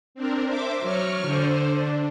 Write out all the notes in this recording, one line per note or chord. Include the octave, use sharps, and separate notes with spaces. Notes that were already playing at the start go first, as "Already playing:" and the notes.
C4 D4 A#4
C5 E5 D6
F#3 C#6 F6
D3 C5
D4